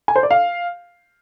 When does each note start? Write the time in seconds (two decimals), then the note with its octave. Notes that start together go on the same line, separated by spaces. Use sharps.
0.08 G#5
0.16 C5
0.23 D5
0.31 F5